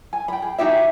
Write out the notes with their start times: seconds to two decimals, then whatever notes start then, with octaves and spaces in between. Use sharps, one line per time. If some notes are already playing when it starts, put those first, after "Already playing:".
0.13 G#5
0.28 G5 B5
0.42 G#4
0.58 D#4 F#4 G4 E5